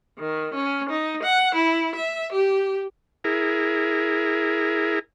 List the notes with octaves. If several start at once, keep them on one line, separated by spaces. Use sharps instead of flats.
D#3
C#4
D#4
F#5
E4
E5
G4
E4 G#4 A#4